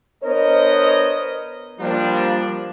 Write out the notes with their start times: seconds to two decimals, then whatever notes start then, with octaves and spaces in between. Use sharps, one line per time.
0.24 B3 D4 A#4 C5 C#5 D#5
1.81 F3 G3 A#3 D4